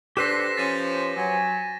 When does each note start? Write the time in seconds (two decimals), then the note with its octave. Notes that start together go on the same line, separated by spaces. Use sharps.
0.17 D4 G4 A4 B4 C5 A#6 B6 E7
0.57 F3 C#4 A6 D#7
1.16 F#3 G#5